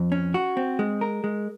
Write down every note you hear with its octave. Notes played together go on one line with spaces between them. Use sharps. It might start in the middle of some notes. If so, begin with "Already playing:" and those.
Already playing: F2
C#4
F#4
C4
G#3
A#4
G#3